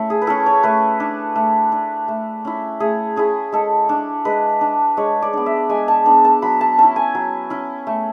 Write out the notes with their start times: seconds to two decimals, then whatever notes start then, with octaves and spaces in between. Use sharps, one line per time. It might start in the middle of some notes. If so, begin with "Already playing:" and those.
Already playing: A3 C#4 E4
0.10 G#4
0.22 B4
0.27 C#4 E4 A4
0.46 C#5
0.63 A3 B4
1.00 D4
1.36 A3
1.72 D4
2.08 A3
2.45 C#4 E4
2.80 A3 G#4
3.16 C#4 E4 G#4
3.52 G#3 A4
3.89 D4
4.25 G#3 B4
4.61 D4
4.97 G#3 C#5
5.22 D5
5.33 B3 D4
5.46 E5
5.69 G#3 G#5
5.88 A5
6.06 B3 D4
6.25 A5
6.42 F#3 B5
6.61 A5
6.79 C#4 E4 A5
6.96 G#5
7.15 F#3
7.50 C#4 E4
7.87 A3